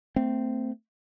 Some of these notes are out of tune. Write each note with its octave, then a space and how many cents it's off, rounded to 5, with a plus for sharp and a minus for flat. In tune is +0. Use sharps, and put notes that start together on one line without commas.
A3 +30 C4 -15